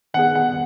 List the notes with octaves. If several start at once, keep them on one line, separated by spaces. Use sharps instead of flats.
D#3 B3 G#4 F#5
F#5